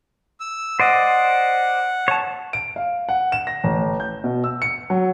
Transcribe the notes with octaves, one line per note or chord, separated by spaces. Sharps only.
E6
C5 D5 D#5 F#5
C#5 A5
D7
F5
F#5
E7
A#6
A1
G6
B2
E6
C#7
F#3